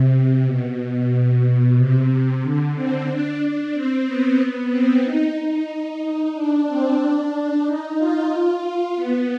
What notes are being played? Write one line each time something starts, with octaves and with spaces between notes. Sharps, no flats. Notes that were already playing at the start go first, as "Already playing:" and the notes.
Already playing: C3
C3
B2
C3
D3
C4
D4
D4
C4
B3
C4
D#4
D#4
D4
C4
D4
D#4
F4
B3